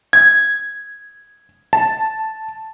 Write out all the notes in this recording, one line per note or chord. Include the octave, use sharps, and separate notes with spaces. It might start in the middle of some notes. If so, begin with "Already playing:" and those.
G#6
A5